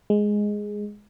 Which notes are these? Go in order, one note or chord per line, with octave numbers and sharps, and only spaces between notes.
G#3